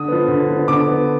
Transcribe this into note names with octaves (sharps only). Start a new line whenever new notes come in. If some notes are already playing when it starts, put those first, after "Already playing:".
Already playing: D3 D#6
F3 B3
D3
F3 B3
D3 D6
F3 B3